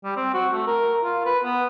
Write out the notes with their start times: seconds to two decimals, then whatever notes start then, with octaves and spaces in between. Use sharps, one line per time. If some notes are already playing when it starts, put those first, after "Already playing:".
0.04 G3
0.16 C4
0.34 F#4
0.53 A3
0.67 A#4
1.04 F4
1.26 B4
1.44 B3